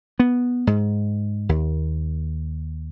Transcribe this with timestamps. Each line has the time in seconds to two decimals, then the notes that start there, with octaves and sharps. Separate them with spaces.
0.19 B3
0.67 G#2
1.49 D#2